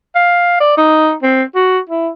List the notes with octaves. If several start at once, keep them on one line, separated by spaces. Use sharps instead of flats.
F5
D5
D#4
C4
F#4
E4